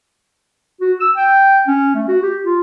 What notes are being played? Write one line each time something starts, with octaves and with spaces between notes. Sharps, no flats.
F#4
E6
G5
C#4
A3
F#4
G4
F4